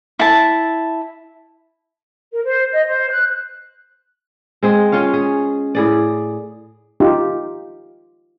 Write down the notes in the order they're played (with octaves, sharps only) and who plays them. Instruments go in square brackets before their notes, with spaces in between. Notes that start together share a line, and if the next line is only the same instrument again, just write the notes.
[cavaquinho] E4 A5
[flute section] A#4
C5
D#5
C5
F#6
[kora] G#3 C4 G#4
C#4 F4 C#5 F5
G#4
A2 G#4 D5
[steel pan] D#4 F4 G4